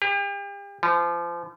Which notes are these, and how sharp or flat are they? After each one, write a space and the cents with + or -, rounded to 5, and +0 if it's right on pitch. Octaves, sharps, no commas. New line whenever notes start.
G4 +40
F3 -30